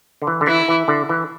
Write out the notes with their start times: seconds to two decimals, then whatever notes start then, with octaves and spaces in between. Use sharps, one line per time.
0.22 D3
0.27 E3
0.41 D3
0.47 E3 E4
0.68 E3
0.88 D3
1.09 E3